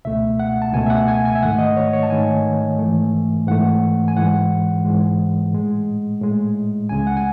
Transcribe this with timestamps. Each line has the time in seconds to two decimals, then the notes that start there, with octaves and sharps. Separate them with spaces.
0.05 C#2 B2 A3 E5
0.40 F#5
0.62 A5
0.73 C#2 B2 A3 G#5
0.86 E5
0.90 F#5
1.08 G#5
1.25 G#5
1.35 E5
1.42 G#2 D#3 A3 F#5
1.59 D#5
1.77 C#5
1.93 C#5
2.03 A5
2.10 G#2 D#3 A3 G#5
2.79 G#2 E3 A3
3.47 G#2 E3 A3 F#5
4.08 G#5
4.16 G#2 E3 G#3 F#5
4.85 G#2 E3 G#3
5.53 A2 G#3
6.21 A2 G#3
6.89 C#2 C#3 G#3 G#5
7.07 F#5
7.17 G#5